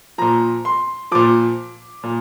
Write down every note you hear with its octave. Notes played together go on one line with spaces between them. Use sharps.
A#2 F3 A#5
C6
A#2 F3 D6
A#2